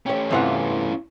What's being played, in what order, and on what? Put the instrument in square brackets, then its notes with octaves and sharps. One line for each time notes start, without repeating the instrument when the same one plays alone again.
[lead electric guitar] A3 C#4 [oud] G4 C#5
[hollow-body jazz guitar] E2 C3 F#5 [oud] G2 E3 F4